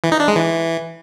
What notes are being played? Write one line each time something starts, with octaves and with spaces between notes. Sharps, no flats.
E3
D#4
D4
G#3
E3